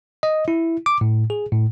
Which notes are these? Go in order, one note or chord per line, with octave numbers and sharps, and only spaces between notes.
D#5
E4
D6
A2
G#4
A2